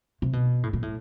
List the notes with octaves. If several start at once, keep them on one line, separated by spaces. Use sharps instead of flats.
C3
B2
A2
A#2
A2